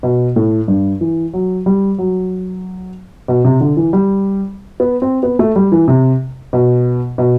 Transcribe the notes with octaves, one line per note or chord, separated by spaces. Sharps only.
B2
A2
G2
E3
F#3
G3
F#3
B2
C3
D3
E3
G3
B3
C4
B3
A3
G3
E3
C3
B2
B2